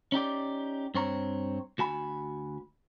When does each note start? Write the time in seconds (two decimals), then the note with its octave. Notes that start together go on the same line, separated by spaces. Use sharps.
0.12 C#4 D#4 G4 D5
0.94 G2 C4 C#5 A#5
1.78 D2 F#4 G#5 B5